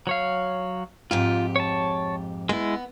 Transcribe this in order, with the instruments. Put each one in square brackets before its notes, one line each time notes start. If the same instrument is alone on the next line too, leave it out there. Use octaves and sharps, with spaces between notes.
[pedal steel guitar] F#3 C#5 F5
[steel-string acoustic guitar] F2 G#2 G4 [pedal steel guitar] F4
[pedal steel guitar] C#5 A5
[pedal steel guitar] G#3 E4 [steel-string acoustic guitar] B3